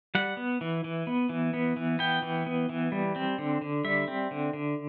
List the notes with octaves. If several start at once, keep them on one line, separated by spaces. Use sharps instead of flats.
G3 F#5
B3
E3
E3
B3
E3
B3
E3
B3 G5
E3
B3
E3
G3
C4
D3
D3
G3 E5
C4
D3
D3